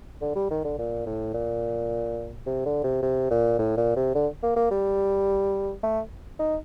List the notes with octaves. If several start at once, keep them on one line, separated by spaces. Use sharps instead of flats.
D3
G3
D#3
D3
A#2
A2
A#2
C3
D3
C3
C3
A#2
A2
A#2
C3
D3
A#3
A#3
G3
A3
D#4